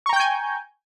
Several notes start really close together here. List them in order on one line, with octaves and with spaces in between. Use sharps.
C#6 A#5 G5 G6 G#5